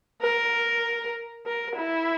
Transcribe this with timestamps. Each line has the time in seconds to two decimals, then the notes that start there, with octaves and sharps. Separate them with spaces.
0.22 A#4
1.46 A#4
1.76 E4